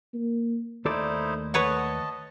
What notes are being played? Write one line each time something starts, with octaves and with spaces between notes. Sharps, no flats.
A#3
D#2 A3 D#4 E4 A4 C5 D5
B4 C#5 D#5 F#5 A5